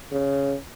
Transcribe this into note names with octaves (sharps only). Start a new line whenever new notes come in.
C#3